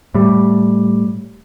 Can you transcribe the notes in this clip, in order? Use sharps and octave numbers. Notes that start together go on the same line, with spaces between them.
A2 G3